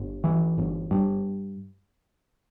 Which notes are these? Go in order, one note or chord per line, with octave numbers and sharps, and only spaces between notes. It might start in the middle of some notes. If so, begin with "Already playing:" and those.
Already playing: G1
E3
G1
G2